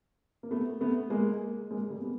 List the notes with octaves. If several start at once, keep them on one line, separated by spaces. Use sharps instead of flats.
A#3
A3 B3
A3 B3
G#3 A#3
G#3 A#3
G3 A3
B3